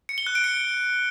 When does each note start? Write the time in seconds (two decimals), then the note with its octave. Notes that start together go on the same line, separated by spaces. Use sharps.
0.09 C#7
0.18 G7
0.27 F#6
0.35 D7
0.44 C#7